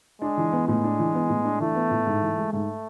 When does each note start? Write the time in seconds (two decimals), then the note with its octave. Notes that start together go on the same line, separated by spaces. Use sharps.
0.22 G#3 D4
0.37 E3
0.53 B3
0.68 A2 G#3
0.84 D4
0.99 E3
1.14 B3
1.29 A2
1.45 D4
1.60 E3 A3
1.75 B3
1.90 A2
2.06 G#2
2.22 E3
2.37 G#3
2.53 G#2 A3